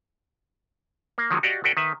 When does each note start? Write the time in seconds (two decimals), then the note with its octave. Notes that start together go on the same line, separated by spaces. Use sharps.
1.18 A#3
1.31 D#3 F3 F#3 G#3
1.43 F#4 G4 D5 D#5 F5 F#5
1.64 F#4 A4 B4 D5 G5
1.77 D#3 B4 E5